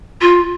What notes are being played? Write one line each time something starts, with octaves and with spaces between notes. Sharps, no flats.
F4